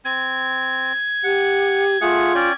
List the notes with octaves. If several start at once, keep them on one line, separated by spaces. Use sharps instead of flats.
C4 G#6
G4 F#5
A3 F4 G#4 F#5
C#4 D5 G5